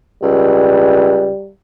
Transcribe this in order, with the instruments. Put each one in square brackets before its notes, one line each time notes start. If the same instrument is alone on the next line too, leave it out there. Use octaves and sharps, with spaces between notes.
[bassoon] C#2 [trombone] G3